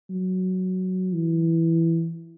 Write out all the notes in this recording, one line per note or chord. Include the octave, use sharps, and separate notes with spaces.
F#3
E3